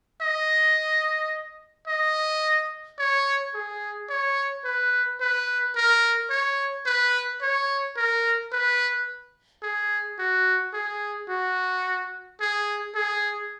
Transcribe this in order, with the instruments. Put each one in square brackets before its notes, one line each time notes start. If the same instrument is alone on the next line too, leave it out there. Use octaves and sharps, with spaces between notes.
[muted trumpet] D#5
D#5
C#5
G#4
C#5
B4
B4
A#4
C#5
B4
C#5
A#4
B4
G#4
F#4
G#4
F#4
G#4
G#4